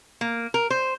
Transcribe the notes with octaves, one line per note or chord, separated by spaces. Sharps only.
A#3
A#4
C5